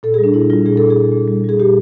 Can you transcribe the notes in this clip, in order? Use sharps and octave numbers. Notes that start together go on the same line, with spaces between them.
A#2 A4
G#4
G3
D4
A#2 E4
G3 F4
A#2 G#4
A#2 A4
G#4
A#2
A#2
G3
G3 G#4
A#2 G4